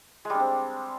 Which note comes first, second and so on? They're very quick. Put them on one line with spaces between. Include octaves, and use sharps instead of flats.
G#3 G3 D4 C4